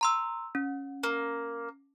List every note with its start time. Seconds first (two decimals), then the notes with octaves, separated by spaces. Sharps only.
0.01 A#5 C6 E6
0.55 C#4
1.03 A#3